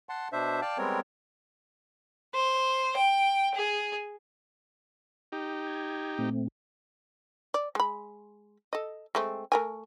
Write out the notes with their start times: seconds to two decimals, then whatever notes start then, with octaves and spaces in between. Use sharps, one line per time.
0.09 F#5 A5 C6
0.33 B2 D4 C5 E5
0.62 D5 F5 G5 A5
0.78 G3 G#3 B3 C4 A#4 C#5
2.35 C5
2.97 G5
3.55 G#4
5.32 D#4 G4
5.67 G#6
6.18 A#2 A3 C4
7.54 D5
7.75 G#3 B5
8.73 A4 D#5
9.15 G#3 A3 C4
9.52 A3 A#4 G#5